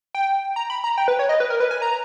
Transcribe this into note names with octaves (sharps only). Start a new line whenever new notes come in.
G5
A#5
B5
A#5
G5
B4
C#5
D#5
B4
A#4
B4
G#5
A#5